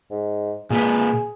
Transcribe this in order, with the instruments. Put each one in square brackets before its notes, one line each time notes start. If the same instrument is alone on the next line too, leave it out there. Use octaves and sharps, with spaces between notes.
[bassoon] G#2
[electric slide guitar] A#2 A#3 B4 [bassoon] G#4